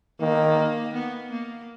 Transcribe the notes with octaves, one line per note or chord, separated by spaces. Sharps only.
D#3 A#3
B3
A#3